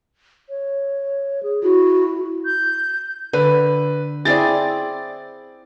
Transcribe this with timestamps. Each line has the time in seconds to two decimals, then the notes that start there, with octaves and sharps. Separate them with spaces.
0.49 C#5
1.43 G#4
1.63 E4 F#4
2.45 G6
3.33 D3 B4
4.25 C4 E4 G#4 D5 A6